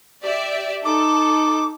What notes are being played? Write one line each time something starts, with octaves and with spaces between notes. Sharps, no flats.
G4 D5 E5
D#4 A4 D6